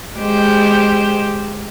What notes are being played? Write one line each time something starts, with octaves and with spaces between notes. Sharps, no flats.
G#3 G4 C5